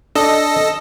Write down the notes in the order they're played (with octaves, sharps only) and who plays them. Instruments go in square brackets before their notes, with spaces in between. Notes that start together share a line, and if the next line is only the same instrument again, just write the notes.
[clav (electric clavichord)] D4 [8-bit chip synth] A4 D#5